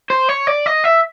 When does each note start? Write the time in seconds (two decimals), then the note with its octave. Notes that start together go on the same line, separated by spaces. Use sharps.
0.10 C5
0.29 C#5
0.47 D5
0.66 D#5
0.85 E5